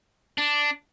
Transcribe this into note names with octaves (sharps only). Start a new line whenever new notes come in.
D4